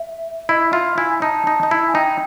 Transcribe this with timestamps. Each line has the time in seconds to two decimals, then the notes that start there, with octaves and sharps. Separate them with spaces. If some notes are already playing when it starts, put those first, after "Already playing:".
Already playing: E5
0.49 E4 D#5
0.73 F4 E5
0.98 E4 G#5
1.22 D#4 A5
1.47 D#4
1.63 D#4
1.71 E4
1.88 G#5
1.95 D#4 G5